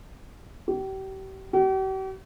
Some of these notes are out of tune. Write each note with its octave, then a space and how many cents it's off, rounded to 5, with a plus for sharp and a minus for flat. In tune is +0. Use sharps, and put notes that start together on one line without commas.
G4 -35
G4 -45